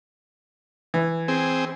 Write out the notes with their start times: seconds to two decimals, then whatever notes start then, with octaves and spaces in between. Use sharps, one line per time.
0.94 E3
1.28 C4 G#4